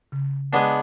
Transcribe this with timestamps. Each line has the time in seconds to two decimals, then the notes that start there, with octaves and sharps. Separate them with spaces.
0.12 C#3
0.53 G#3 B3 D4